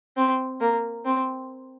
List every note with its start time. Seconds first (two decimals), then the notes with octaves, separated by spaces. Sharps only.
0.17 C4
0.61 A#3
1.05 C4